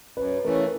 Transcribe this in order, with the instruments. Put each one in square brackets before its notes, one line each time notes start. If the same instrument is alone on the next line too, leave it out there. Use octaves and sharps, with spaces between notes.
[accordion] F#2 [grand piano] B4
[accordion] C#3 E3 A3 [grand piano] A#4